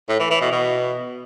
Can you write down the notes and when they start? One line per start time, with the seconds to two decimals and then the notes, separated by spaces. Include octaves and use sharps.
0.09 A2
0.20 E3
0.31 E3
0.41 B2
0.52 B2